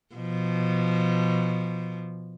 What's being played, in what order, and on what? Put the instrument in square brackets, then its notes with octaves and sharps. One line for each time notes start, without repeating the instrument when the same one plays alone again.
[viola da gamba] B2 F3